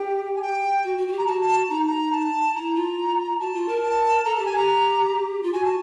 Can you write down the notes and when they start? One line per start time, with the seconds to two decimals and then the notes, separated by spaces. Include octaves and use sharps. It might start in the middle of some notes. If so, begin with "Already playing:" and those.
Already playing: G4 G5
0.35 G#5
0.42 G5
0.84 F#4
0.98 F#4
1.08 F#4
1.12 G4
1.18 A#5
1.26 F#4 A5
1.41 A5
1.69 D#4 A#5
1.87 A#5
2.12 A5
2.55 E4 A#5
2.76 F4
3.39 F#4 A5
3.54 F4
3.69 A#4
3.82 A5
4.24 A4 A#5
4.35 G4 A5
4.46 G#5
4.53 G4 A#5
5.43 F4
5.53 F#4 G#5
5.64 A5